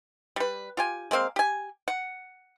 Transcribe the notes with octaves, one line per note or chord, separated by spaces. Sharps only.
G3 B4
F4 G4 G#5
G#3 A#3 C4 F5
G4 G#5
F#5